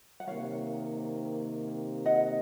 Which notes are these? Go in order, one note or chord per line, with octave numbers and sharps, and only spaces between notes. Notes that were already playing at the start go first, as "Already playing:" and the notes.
F#5
C3 D#3 A#3 C#5 F5
D#5 F#5